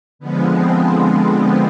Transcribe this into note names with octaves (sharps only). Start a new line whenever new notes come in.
D3 F3 G#3 B3
C4
C4
C4